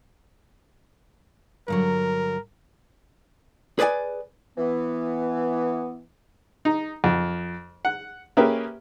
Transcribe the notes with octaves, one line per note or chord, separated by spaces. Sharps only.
G2 D3 F#3 A#4
G#4 B4 D5 F5 G#5
E3 B3
D#4
F2
F#5
A#3 C#4 G4 G#4 B4 E5